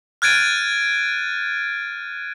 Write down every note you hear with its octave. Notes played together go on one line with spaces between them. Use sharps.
F6 F#6 G#6 A6 D7 D#7